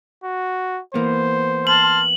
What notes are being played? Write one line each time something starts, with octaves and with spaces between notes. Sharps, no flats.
F#4
E3 A#3 B3 C5
A5 C6 F6 F#7